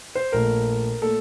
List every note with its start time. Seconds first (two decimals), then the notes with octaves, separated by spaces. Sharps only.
0.15 C5
0.32 A#1 A#2 A3 A#4
1.02 A#2 A3 A4